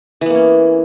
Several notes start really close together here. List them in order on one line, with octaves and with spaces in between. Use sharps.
E3 B3 A#3 C#4